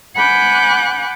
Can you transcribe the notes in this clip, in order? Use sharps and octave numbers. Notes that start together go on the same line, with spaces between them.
F#5 G#5 B5 D6 F#6 G6